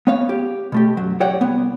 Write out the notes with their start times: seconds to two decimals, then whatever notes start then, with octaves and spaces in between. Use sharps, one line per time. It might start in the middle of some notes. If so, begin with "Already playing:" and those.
0.07 B3 C#5 F5
0.29 G4
0.72 B2 A3 G4
0.97 F#2 F#3
1.20 G4 C#5 D5 F#5 G5
1.41 C2 B3